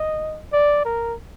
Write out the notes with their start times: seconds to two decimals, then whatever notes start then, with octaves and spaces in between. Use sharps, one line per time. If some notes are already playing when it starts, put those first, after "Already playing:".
Already playing: D#5
0.53 D5
0.85 A#4